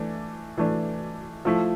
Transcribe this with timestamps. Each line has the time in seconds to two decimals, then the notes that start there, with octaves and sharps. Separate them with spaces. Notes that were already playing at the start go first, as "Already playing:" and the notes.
Already playing: E3 A3 D4
0.58 E3 A3 D4
1.45 F3 A3 E4